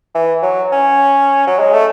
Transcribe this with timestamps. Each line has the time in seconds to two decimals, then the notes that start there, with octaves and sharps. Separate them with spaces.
0.15 E3
0.42 F#3
0.72 C#4
1.47 F#3
1.59 G#3
1.73 A3